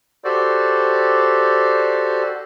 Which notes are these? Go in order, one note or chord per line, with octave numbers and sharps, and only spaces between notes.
F#4 G4 A4 C5 D5